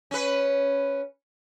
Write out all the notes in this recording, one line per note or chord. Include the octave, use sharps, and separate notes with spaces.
C#4 B4